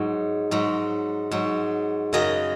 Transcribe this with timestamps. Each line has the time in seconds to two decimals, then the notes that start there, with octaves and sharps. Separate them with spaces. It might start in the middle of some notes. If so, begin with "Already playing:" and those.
Already playing: G#2 F#3
0.51 G#2 F#3
1.31 G#2 F#3
2.13 F#2 C#3 F#3 D#5